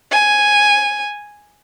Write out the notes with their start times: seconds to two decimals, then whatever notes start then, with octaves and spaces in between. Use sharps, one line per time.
0.11 G#5